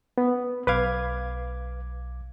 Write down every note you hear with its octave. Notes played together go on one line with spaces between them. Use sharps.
B3
B1 B4 F5 D6 G#6